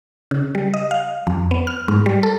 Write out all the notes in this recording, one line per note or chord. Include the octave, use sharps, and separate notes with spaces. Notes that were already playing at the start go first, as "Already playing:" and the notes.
C#3
G3
D#5
F5
F2
B3
F6
G#2
G3
A4